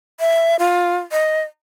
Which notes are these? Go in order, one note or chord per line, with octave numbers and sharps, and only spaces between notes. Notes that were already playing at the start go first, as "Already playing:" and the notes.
E5
F4
D#5